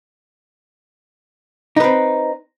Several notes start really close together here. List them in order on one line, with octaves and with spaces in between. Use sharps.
D#4 B4 C4